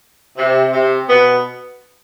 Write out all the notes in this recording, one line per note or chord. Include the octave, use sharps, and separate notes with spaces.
C3
C3
B2 B3